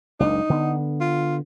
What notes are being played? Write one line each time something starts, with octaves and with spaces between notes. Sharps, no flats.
F#1 C#2 D4 D#4
D3 B3
F4